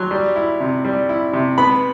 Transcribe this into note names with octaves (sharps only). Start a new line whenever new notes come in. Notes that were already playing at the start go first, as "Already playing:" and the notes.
Already playing: F#3 C6
G3
E4
C3
G3
E4
C3
B3 B5